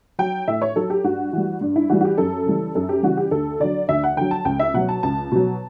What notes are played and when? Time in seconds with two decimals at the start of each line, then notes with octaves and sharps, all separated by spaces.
0.19 F#3 G5
0.47 A2 E5
0.62 C#5
0.76 F#3 A4
0.90 G4
1.04 G2 F#4
1.33 E3 G3
1.61 G2 D4
1.76 E4
1.89 E3 G3 F#4
2.01 F#4
2.05 G4
2.18 F#2 A4
2.46 C#3 E3 G3
2.75 F#2 A4
2.89 G4
3.03 C#3 E3 G3 F#4
3.17 G4
3.31 D2 A4
3.60 D3 F#3 D5
3.89 D2 E5
4.03 F#5
4.17 D3 F#3 G5
4.31 A5
4.45 C#2 G5
4.59 E5
4.74 B2 F#3 F#5
4.89 A5
5.03 C#2 A5
5.32 B2 F#3